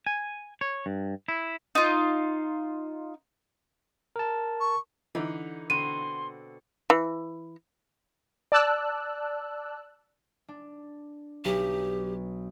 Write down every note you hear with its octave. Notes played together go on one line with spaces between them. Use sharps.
G#5
C#5
G2
E4
D#4 F4
A#4 A5
C#6
D3 E3 D#4
B2 D3 C4 C6 D#7
E3
D5 A5 E6 F#6
D4
B1 G4